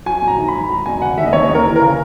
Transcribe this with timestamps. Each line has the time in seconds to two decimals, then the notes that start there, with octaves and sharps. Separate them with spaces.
0.06 F#3 G#5
0.22 A#1
0.28 A#5
0.38 D#3
0.48 B5
0.54 G#2
0.69 F#3 A#5
0.86 E1 G#5
1.02 C#3 F#5
1.17 D#2 E5
1.26 D#5
1.33 D#2 C#5
1.49 D#2
1.55 A#4
1.65 E3
1.76 A#4
1.81 C#3